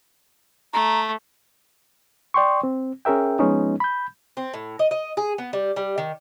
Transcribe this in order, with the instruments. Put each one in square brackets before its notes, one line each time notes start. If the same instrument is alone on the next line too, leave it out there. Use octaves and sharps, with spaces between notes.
[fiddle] A3 [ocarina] A#5
[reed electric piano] D5 G5 C6 C#6
C4
C#4 G#4 A#4 E5 G5
F3 G#3 B3 C#4 D#4
B5 G6
[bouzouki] C4
A2
D#5
D#5
G#4
B3
G3
G3
D#3